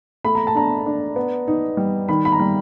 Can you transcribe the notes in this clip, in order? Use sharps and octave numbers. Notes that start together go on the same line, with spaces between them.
A3 B5
A#5
A5
D4 A#5
D4
B3
D#4
G3
D#3 B5
B5
A#5
G3